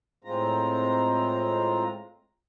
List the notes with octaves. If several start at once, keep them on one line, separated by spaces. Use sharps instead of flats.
A2 G#3 C4 F4 A#5